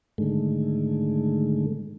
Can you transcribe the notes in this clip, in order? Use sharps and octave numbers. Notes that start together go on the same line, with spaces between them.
G#2 D3 D#3 G#3 A3